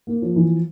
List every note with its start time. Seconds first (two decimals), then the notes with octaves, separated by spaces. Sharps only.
0.07 A#3
0.22 F3
0.36 E3